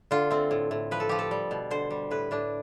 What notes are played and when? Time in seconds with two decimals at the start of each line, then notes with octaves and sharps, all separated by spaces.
0.11 D3 F4
0.31 A3 C4
0.51 A2
0.71 A2
0.91 F3 B4
1.00 A4
1.09 F3 G4
1.19 A4
1.31 G3
1.51 B2
1.71 D3 C5
1.91 G3
2.11 A2 B4
2.31 A2 D4